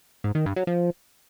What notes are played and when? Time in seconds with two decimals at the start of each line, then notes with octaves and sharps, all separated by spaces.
0.24 G#2
0.35 D#3
0.46 G2
0.56 F#3
0.67 F3